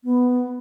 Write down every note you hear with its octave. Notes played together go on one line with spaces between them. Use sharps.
B3